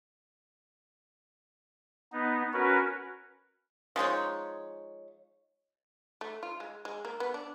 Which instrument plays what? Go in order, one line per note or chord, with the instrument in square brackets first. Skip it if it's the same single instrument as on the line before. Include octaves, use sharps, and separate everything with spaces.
[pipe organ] B3 D#4
C#4 F#4 A#4 B4
[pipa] F3 G#3 D#4 C#5
[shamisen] A3
F4
G#3
G#3
A#3
B3
D4